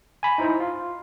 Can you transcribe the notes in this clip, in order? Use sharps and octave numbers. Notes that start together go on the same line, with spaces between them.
G#5 B5
D#4 E4 C5
F4